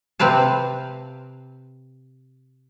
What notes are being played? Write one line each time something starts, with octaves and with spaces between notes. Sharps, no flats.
C3 C4 B4 F5 A5